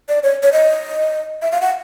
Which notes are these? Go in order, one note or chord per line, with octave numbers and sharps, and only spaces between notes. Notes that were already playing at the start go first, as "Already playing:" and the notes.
D5
C#5
C#5
D#5
E5
F5
F#5